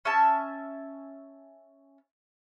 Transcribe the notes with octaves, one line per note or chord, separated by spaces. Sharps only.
C#4 E5 A5